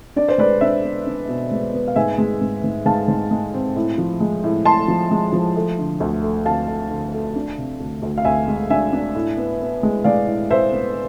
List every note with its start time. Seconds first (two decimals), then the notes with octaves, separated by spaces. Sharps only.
0.16 D4 D5
0.29 C5
0.38 G#3 B4 D5
0.61 D4 C5 E5
0.84 B3
1.07 D4
1.28 B2
1.51 G#3
1.73 B3
1.88 F5
1.96 G#2 E5 G#5
2.18 G#3
2.42 G#2
2.64 G#2
2.86 G#2 F5 A5
3.08 G#2
3.31 G#3
3.54 C4
3.76 A2
3.98 F3
4.20 G#3
4.44 A2
4.65 A2 A5 C6
4.88 F3
5.11 G#3
5.33 F3
5.56 A3
5.79 D3
6.00 D2
6.22 A3
6.45 D2 F5 A5
6.67 A3
6.90 D3
7.13 A3
7.36 D4
7.57 C3
7.80 D2
8.02 D2
8.18 F5
8.25 D2 E5 G#5
8.48 G#3
8.70 D4 E5 G#5
8.93 D4
9.15 A2
9.37 B3
9.61 B3
9.83 G#3
10.04 G#3 D5 F5
10.27 A2
10.50 A2 C5 E5
10.72 B3